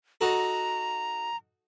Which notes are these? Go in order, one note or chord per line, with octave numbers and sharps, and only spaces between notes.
D#4 F#4 A4 A#5